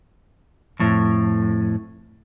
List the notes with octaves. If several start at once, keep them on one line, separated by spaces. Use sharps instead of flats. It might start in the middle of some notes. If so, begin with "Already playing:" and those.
F2 A2